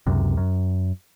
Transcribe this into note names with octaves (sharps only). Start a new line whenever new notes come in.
C#2 F#2 C3
F#2